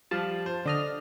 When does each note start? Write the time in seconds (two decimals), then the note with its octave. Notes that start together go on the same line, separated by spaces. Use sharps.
0.11 F3 G3 F4 F5 A5
0.46 C5
0.66 D3 D4 D#5 F6